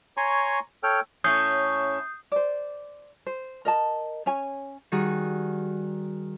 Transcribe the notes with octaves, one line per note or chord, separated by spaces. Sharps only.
C#5 G#5 A#5 C6 C#6
A4 C#5 G5 F6
A2 C#4 D#6 G6 C7
C5 D5
C5
A#4 D#5 A5
C#4 C#5 G#5
D#3 G3 F#4 G#4